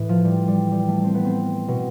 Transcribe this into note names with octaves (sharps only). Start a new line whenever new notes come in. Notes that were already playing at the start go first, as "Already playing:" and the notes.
Already playing: A2 E3
F3
G3
G3
G3
A3
C4
B3
C4
B2